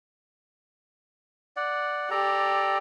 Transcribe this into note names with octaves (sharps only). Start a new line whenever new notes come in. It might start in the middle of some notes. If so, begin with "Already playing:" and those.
D5 F#5
G4 A4 D5 A#5